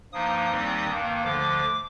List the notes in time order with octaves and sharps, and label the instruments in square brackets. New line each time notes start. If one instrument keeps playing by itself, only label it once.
[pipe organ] G2 F3 A#3 D#4 D#6
D#2 D#3 G3 C4 D#4
G2 D#3 A#3
D2 D3 F3 D6